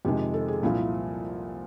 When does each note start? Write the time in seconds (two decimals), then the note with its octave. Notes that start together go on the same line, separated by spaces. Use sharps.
0.05 F2 C3 D#3 G#3 G4
0.34 A4
0.48 G#4
0.62 C2 A#2 F3 E4